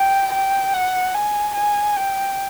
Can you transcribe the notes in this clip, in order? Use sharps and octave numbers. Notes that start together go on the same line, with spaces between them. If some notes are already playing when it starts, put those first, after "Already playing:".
Already playing: G5
G5
F#5
G#5
G#5
G5